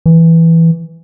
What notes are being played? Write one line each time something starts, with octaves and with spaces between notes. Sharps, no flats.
E3